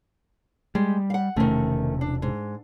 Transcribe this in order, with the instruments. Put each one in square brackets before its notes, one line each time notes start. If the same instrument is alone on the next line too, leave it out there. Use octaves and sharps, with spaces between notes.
[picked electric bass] G3 [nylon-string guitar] G#3
[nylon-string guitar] F5 F#5
[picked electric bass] E1 C3 C#4 [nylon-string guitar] D#3 A3
[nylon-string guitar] D4
G#2